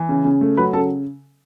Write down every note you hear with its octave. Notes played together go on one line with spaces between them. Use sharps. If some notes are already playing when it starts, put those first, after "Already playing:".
Already playing: E3
C#3
C#3
A3
F#3 B4 B5
C#3 A4 A5